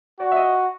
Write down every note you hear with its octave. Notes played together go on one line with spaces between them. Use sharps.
F#4 D5
E5
D#5